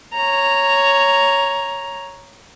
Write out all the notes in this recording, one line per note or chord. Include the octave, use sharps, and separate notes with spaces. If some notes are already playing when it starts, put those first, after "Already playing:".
C#5 A#5